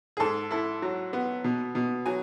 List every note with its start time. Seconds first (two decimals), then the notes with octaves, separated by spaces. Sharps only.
0.17 G#4
0.20 G#2 A4
0.51 E4 A4
0.82 F#3
1.13 B3
1.44 B2
1.75 B2
2.06 F#3 G#5